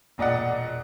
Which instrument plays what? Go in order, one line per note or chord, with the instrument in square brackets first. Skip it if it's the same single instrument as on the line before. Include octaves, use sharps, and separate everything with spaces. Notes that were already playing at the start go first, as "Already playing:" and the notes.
[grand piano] E1 A#2 D5 D#5 F#5